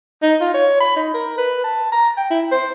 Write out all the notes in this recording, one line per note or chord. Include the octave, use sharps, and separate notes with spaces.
D#4
F4
C#5
B5
D#4
A#4
B4
A5
A#5
G5
E4
C5